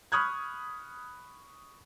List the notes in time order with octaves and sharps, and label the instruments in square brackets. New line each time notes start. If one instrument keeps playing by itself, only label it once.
[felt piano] B5 C#6 D#6 F6 F#6 G#6